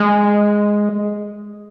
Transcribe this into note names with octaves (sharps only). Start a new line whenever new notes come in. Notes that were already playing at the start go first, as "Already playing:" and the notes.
Already playing: G#3